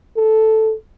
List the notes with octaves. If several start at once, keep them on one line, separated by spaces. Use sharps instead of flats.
A4